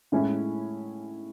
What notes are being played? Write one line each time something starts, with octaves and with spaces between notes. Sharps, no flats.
A2 G#3 C#4 E4